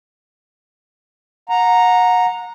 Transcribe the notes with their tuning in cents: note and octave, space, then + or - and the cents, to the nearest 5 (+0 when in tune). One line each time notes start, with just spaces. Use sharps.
F#5 -30 A#5 +0